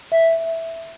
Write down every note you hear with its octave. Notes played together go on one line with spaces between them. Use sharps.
E5